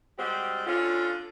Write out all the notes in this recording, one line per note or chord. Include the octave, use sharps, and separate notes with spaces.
G3 G#3 C4 F#4 G4
D3 C#4 F4